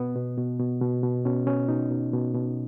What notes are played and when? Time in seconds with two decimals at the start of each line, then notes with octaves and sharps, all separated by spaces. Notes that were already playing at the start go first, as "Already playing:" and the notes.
Already playing: B2 B3
0.15 B2
0.37 B2
0.60 B2
0.81 B2
1.03 B2
1.25 B2 C#4
1.47 B2 C#4
1.68 B2 D#4
1.90 B2
2.13 B2
2.35 B2